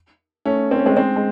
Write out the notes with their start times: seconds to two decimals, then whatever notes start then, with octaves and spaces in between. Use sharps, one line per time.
0.45 A3 C#4
0.71 C4
0.79 C#4
0.86 G#3 C4
0.97 G#3 C4
1.16 G#3